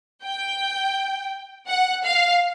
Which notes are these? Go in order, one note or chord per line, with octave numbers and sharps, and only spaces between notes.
G5
F#5
F5